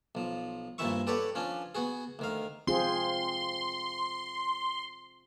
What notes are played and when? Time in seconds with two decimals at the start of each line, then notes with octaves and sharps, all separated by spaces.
0.15 B1 F3
0.78 G2 A#2 C4 E4 E5 C#6
1.07 G4 A4 B4 C#5 D5 F#5
1.35 F3 C#4 D4
1.75 B3 F#4 G#4
2.19 D2 D#3 F5
2.67 C4 F4 G#4 C6